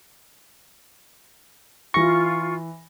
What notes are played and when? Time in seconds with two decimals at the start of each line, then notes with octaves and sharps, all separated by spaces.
1.94 E3 F4 C#6 A#6